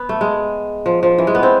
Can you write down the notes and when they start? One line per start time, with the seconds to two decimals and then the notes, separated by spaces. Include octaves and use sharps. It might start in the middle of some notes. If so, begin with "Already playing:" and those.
Already playing: B3
0.09 A3
0.21 G#3
0.86 F3
1.03 F3
1.18 E3
1.27 G#3
1.35 B3
1.43 C4